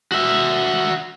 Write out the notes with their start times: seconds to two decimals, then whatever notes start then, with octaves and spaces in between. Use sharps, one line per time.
0.12 F#4 E5